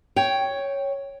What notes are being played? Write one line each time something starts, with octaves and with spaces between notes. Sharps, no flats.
C#5 G5